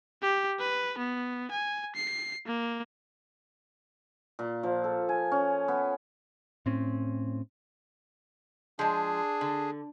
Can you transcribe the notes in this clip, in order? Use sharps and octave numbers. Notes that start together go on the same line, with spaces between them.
G4
B4
B3
G#5
C7
A#3
A#2
F3
A4
G#5
C#4
B3
A2 C4 C#4
F3 G#3 D4 G#4
D3